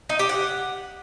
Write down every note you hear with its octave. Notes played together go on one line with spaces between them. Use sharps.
D#4
G4
F#5